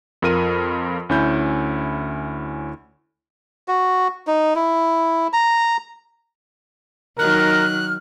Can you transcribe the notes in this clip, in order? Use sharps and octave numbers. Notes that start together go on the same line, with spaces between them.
F2 F4 A#4 D#7
D2 C#4 E4 G6
F#4
D#4
E4
A#5
D#3 F#3 D#4 A#4 F6 F#6